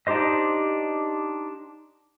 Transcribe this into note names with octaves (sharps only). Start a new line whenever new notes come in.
D4 D#4 G4 C5 D#5